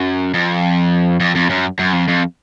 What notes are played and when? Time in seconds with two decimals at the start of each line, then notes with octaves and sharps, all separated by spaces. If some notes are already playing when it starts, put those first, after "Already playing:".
Already playing: F#2
0.34 F2
1.20 F2
1.35 F2
1.50 F#2
1.79 F#2
1.93 F2
2.08 F2